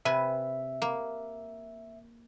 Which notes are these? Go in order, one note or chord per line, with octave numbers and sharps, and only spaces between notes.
C3 B4 E5 G#5
A#3